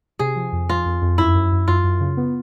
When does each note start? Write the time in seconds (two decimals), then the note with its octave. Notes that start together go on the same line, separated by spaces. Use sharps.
0.19 C3 G#4
0.36 F3
0.52 F2
0.70 F3 F4
0.86 F2
1.02 F2
1.18 F#2 E4
1.35 F#2
1.52 F#2
1.68 F#2 F4
1.84 F#2
2.00 C#3
2.17 B3